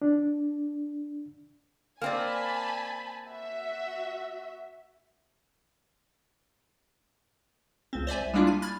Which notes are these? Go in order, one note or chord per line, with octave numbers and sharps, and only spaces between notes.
D4
A#3 C4 D5 G#5 A5 B5
F#4 E5
C#2 C4
C5 D5 E5 G#5
C2
G3 G#3 A#3 D4 E4 F4
G#5
B5 F6 G#6 A6